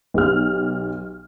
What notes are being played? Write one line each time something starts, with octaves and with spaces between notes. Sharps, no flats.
B1 G4 F6